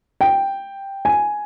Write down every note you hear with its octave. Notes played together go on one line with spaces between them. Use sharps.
G5
G#5